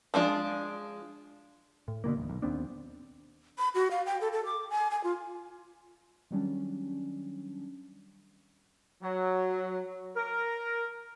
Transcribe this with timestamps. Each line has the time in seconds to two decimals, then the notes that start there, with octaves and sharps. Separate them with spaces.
0.14 F3 G#3 D4 F4
1.88 A2
2.04 B2 D3 D#3 A#3
2.17 D#1 A#1
2.29 B1
2.42 D#2 B3 C4 D4
3.58 B5
3.75 F#4
3.91 F5
4.06 G5
4.21 A4
4.33 A4
4.45 D6
4.70 G#5
4.91 G#5
5.04 F4
6.31 D#3 F#3 G3 C#4 D4
9.03 F#3
10.16 A#4